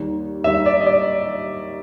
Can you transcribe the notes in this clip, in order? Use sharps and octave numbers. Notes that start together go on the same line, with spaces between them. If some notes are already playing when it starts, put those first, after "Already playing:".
Already playing: D#2 D#3 G3
D#2 D#3 G3 E5
D5
D#5
D5